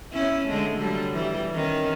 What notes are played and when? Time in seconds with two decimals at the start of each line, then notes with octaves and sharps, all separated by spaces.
0.13 C#4 E4
0.47 D3 G#3 A3
0.78 D3 F#3 G3
1.13 E3 G3
1.54 D#3 C#4